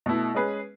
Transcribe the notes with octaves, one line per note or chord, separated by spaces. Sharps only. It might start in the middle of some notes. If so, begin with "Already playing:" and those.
B2 A3 E4
G#3 C#4 G#4 B4